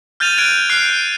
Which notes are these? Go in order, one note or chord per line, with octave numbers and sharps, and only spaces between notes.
F6 G6 A6 D#7 F7
F6 F#6 G#6 D7 D#7 F7
F6 F#6 C7
D7